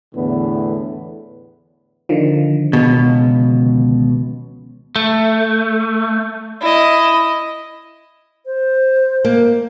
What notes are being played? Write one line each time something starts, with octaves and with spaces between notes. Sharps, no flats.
E2 A2 D3 B3
D3 D#3 F3
C#2 B2
A3
E4 D#5
C5
A#3